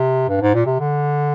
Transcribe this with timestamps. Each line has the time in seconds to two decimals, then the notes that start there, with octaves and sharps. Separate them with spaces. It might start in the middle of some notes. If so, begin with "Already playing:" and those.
Already playing: C3
0.29 G2
0.41 G#2
0.54 A#2
0.66 C3
0.80 D3